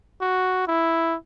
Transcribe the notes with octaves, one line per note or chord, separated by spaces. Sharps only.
F#4
E4